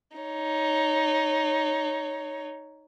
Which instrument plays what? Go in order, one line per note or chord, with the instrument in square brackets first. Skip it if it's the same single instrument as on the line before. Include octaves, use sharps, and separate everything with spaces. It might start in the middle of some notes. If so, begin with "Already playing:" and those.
[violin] D#4 C#5